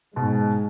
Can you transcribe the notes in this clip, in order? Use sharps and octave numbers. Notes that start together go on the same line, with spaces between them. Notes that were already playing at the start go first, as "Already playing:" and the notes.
G#2 B2 G#3